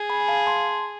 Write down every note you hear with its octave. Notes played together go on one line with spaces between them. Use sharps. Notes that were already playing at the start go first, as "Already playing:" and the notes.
Already playing: G#4
G#5 B5
F5 A5
A5 C6